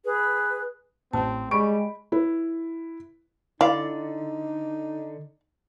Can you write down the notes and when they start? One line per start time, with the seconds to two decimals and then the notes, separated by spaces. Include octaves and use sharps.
0.04 G#4 B4
1.13 A1 C4 A5
1.51 G3 G#3 B5 C#6 D7
2.12 E4 B4
3.61 D3 D#4 E4 D5 F5